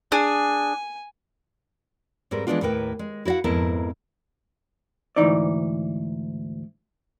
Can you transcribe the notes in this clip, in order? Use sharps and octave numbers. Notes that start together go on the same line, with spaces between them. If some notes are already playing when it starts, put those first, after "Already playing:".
D4 G#4 G#5
G#2 G3 C4 A#4 B4
E3 G#3 A3 B3 D4 F4
D#2 A2 E4 A#4 B4 G5
G#3
E4 F#4 D5 F5 F#5
F2 G#2 B3 E4 A#4 A5
D2 G#2 E3 D#4 D5